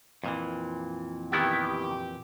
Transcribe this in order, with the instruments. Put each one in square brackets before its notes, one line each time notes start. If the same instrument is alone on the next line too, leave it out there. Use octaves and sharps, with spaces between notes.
[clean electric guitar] F2 A#2 E3
[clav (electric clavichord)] D#3 B3 E4 [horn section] G4